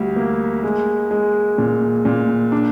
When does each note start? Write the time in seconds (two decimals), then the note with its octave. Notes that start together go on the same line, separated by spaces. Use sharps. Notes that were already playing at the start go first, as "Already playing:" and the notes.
Already playing: D2 G3
0.16 A#3
0.63 G#3
1.11 G#3
1.58 A#2
2.05 A#2
2.52 D4